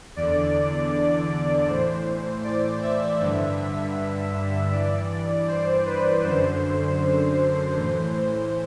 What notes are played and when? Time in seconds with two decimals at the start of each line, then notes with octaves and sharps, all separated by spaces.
0.16 E2 D3 D5
1.68 A2 E3 C5
2.44 D5
2.83 E5
3.20 G2 D3
4.72 G2 E3 D5
5.10 D5
5.48 C5
5.86 B4
6.23 F#2 D3 C5
7.76 A2 E3 C5